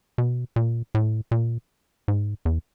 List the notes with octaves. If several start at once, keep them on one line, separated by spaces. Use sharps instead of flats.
B2
A#2
A2
A#2
G#2
E2